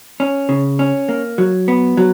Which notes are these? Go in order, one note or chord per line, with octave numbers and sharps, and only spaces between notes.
C#4
C#3
C#4
A#3
F#3
B3
F#3